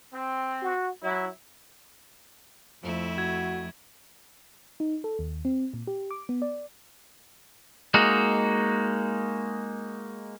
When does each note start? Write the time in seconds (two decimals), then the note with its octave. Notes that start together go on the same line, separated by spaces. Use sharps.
0.14 C4
0.62 F#4
1.03 F#3 E4
2.83 F2 F3 A3 E4
3.18 F#4 G#6
4.80 D#4
5.04 A4
5.19 D#2
5.45 C4
5.74 A#2
5.87 G4
6.11 D6
6.29 B3
6.42 D5
7.94 G#3 A#3 D#4 F#4